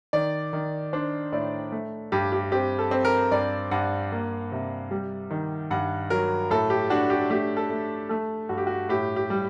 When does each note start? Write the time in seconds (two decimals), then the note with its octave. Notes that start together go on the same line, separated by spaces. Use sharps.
0.13 D#3 D5
0.53 D#3
0.93 D4 C5
1.32 A2 D5
1.72 A3
2.12 G2 G4
2.32 G4
2.52 C4 G4
2.79 A4
2.91 C4
3.05 A#4
3.32 G2 D5
3.71 G2 F#5
4.12 A#3
4.52 C3
4.91 G3
5.30 D#3
5.71 G2 F#5
6.10 F#3 A#4
6.51 A2 A4
6.70 G4
6.90 D4 F#4
7.10 G4
7.30 A3 G4
7.57 A4
7.70 A3
8.09 A3 A4
8.49 G2 F#4
8.58 G4
8.67 F#4
8.89 A2 G4
9.16 G4
9.30 G3